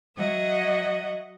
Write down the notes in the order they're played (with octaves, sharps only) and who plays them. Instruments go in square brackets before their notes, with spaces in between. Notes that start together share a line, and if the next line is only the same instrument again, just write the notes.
[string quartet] F#3 D#5 E5 F#5